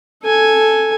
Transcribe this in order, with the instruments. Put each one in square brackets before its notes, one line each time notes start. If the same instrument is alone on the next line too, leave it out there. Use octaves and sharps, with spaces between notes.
[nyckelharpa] A4 G#5